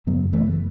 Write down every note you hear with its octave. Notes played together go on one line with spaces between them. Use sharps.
F#2 C#3 F#3 B3
E3 A3